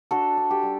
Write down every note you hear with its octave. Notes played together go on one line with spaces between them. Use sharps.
D4 F#4 A4
D4
G4
G3